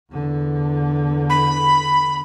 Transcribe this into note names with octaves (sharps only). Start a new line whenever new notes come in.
E2 D3
B5